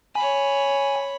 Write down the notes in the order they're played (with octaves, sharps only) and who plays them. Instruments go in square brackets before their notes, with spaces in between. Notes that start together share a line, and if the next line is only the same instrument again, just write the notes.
[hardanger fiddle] C#5 B5 [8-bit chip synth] G#5